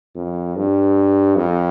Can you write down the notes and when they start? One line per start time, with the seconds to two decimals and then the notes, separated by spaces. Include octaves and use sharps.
0.16 F2
0.56 G2
1.36 F2